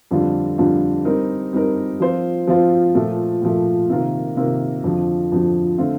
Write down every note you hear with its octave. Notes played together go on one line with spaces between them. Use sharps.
F2 D3 G3 D4 F4
F2 D3 G3 D4 F4
G3 C4 D#4 A#4
G3 C4 D#4 A#4
F3 C4 F4 C5
F3 C4 F4 C5
A#2 F3 A3
A#2 F3 A3
C3 D#3 A#3 F4 A#4
C3 D#3 A#3 F4 A#4
F2 D3 F3
F2 D3 F3
D3 A3 C4 F4